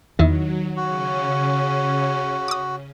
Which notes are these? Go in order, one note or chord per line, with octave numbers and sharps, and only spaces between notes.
E2 D#3 F#3 E4
C#3 C#4 F#4
D6 D#6